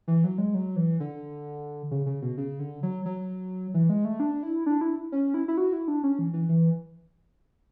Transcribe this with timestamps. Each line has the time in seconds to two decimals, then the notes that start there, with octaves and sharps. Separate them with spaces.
0.08 E3
0.24 F#3
0.38 G#3
0.55 F#3
0.76 E3
1.00 D3
1.91 C#3
2.06 C#3
2.22 B2
2.37 C#3
2.59 D3
2.83 F#3
3.05 F#3
3.74 E3
3.90 G#3
4.05 A3
4.20 D4
4.43 E4
4.66 D4
4.81 E4
5.12 C#4
5.34 E4
5.48 E4
5.57 F#4
5.73 E4
5.88 D4
6.03 C#4
6.19 E3
6.33 E3
6.49 E3